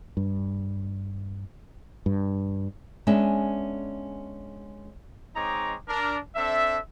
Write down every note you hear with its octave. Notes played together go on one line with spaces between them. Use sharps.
G2
G2
G#3 B3 C#4 D4 E5
G#3 C4 D#4 C#5 A#5 D6
D4 A#4
C4 D4 A4 E5